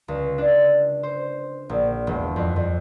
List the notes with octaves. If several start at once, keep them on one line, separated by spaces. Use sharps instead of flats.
C#2
D4
C5
A#1
E1
F2
F2